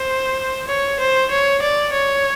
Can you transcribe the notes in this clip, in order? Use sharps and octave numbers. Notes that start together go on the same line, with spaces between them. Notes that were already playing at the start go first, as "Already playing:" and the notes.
Already playing: C5
C#5
C5
C#5
D5
C#5